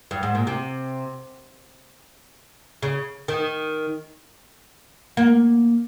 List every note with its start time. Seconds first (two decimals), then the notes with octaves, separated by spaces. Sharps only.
0.11 G2
0.23 G#2
0.35 A#2
0.47 C3
2.83 C#3
3.28 D#3
5.17 A#3